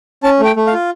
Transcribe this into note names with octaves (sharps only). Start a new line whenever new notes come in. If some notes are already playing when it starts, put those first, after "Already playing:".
C#4 A5
A3
G5
A3
F5
F4